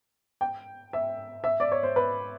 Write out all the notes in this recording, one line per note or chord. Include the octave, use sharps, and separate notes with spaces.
G5
E5
E5
D5
C#5
C5
B4